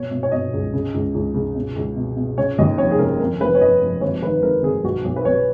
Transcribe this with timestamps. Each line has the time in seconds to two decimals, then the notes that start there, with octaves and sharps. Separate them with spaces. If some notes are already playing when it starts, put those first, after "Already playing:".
Already playing: B2 C#5
0.11 B2
0.23 C#5
0.32 B2 D#5
0.53 C#2
0.73 C#3
0.94 C#2
1.14 C#2
1.34 C#3
1.55 B2
1.76 C#2
1.96 B2
2.17 B2
2.38 C#3 C#5
2.58 D#2 D#5
2.78 F1 C#5
2.91 G#4
2.99 C#3 A#4
3.19 F2 A#4
3.40 F1 B4
3.55 C#5
3.61 F1 D#5
3.82 F1
4.01 G#1 C#5
4.22 D#3 B4
4.42 G#1 A#4
4.63 G#1 G#4
4.84 B1 F#4
5.04 B1
5.16 B4
5.25 B1 C#5